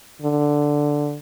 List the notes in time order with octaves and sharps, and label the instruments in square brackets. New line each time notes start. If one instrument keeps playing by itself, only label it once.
[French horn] D3